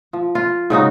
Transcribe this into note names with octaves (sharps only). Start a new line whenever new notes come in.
F3
F4
G#2 C#3 D#4 F#4